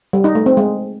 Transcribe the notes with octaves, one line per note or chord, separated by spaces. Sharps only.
G3
D#4
A3
C4
G#3